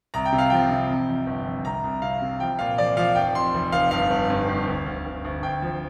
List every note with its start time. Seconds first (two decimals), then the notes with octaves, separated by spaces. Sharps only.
0.14 C2 A#5
0.25 G5
0.32 C3
0.38 F5
0.50 F3 G5
0.71 C3
0.88 F2
1.08 F2
1.27 G1
1.45 F2
1.64 C2 A#5
1.84 C2
2.02 C3 F5
2.22 C3
2.40 F3 G5
2.59 A#2 F5
2.78 F3 D5
2.97 F3 F5
3.15 F1 G5
3.34 F2 C6
3.54 F1
3.72 F1 F5
3.91 G1 F5
4.10 G1
4.30 G2
4.49 G1
4.67 D2
4.86 D2
5.05 D2
5.24 D2
5.43 D2 G5
5.62 F3